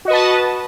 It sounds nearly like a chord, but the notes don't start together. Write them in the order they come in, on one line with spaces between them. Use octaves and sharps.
F#4 D#5 B4 A5